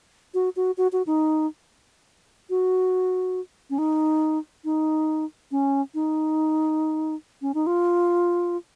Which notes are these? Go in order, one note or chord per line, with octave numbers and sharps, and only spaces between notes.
F#4
F#4
F#4
F#4
D#4
F#4
C#4
D#4
D#4
C#4
D#4
C#4
D#4
F4